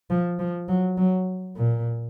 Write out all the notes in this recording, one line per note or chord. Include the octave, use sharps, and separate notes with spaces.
F3
F3
F#3
F#3
A#2